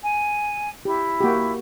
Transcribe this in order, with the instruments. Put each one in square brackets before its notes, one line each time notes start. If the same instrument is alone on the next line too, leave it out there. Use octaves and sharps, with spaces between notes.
[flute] G#5
[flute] E4 [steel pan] G4
[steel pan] A#3 F#4 G4